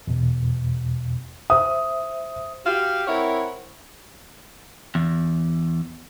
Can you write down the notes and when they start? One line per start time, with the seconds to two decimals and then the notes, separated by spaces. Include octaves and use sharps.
0.07 E2 B2
1.50 C5 E5 D#6
2.66 F#4 G4 F5
3.08 C4 E4 A#4 C#5 F#5
4.95 E2